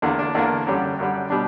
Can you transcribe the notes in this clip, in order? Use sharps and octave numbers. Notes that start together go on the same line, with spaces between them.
E2 D3 A#3 D4
D4
E2 D3 A#3 D4
F#2 D3 G3 C#4
F#2 D3 G3
B2 G3 D4